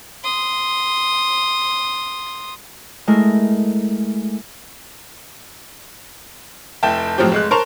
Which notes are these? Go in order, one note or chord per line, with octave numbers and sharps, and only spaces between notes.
C6 D#6
G#3 A3 E4 A#4
F1 E4 G5 A5
A2 F3 F#3 C4 G4
F1 G#3 F#6
A#4 C5 A5 C6 C#6 F7